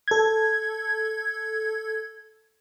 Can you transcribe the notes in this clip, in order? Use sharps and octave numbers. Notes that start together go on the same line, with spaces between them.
A4 G#6